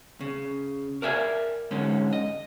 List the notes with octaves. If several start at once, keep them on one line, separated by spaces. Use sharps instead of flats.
C#3
A#4 D5 E5 G#5
G#2 D3 C#4
D#5